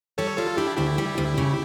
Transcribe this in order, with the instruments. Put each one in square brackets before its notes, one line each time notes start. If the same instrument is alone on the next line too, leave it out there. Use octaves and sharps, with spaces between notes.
[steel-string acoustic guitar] G3 [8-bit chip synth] A4 C#5
[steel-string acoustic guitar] G3 [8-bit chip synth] F4 A4
[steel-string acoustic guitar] D4 [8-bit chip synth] E4 G4
[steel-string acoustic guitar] D2 [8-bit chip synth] E4 G4
[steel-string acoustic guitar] G3
D2
C#3